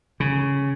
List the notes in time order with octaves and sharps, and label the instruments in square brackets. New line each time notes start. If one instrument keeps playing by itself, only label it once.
[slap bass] C#3